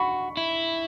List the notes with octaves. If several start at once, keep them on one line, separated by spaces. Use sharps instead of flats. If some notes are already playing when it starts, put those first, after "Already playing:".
Already playing: F#4 B5 C#6
E4